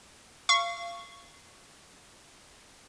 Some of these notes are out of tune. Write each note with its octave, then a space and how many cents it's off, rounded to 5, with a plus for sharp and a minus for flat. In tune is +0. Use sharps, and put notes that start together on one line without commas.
F5 -25 C#6 +0